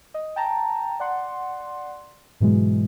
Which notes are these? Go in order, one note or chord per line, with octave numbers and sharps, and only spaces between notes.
D#5
G5 A5 A#5
D5 F#5 C6
G#2 B2 E3 F#3 G#3